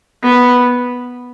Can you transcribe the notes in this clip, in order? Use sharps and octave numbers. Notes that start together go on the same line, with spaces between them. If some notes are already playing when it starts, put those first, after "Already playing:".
B3